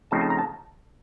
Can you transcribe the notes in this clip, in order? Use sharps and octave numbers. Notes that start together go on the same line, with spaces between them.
C#3 F3 A3 C4 D#4 A5
A5
A#5
A5